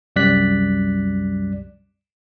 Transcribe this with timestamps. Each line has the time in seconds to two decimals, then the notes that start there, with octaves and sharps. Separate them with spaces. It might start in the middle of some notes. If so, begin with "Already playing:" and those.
0.16 C2 F#2 G3 D5 F#6 B6